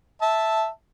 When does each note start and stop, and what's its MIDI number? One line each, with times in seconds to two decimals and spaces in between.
0.22 0.68 76
0.22 0.68 81